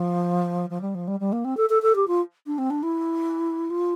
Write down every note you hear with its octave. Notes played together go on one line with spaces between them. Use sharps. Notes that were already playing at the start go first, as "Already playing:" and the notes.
Already playing: F3
F3
G3
F3
G3
G3
A#3
C4
A4
A4
A4
G4
F4
D4
C4
D4
E4
F4